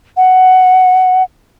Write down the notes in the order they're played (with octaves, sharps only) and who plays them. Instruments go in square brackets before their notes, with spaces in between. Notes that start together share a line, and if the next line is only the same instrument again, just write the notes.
[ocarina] F#5